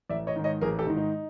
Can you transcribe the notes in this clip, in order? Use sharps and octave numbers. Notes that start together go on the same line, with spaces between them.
A1 D5 E5
C#5 D#5
G#2 D#3
C#5 D#5
A1 G#4 A#4
G4 A4
G#2 D#3
D#4